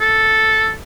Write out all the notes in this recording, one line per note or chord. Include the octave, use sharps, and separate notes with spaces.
A4